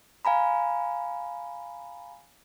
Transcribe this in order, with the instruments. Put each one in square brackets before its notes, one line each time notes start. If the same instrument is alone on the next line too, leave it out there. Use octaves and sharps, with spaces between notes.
[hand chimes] F5 G#5 A#5 B5